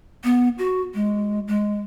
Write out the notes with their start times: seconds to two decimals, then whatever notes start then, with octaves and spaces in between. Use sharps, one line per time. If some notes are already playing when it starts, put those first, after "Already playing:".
0.24 B3
0.58 F#4
0.94 G#3
1.48 G#3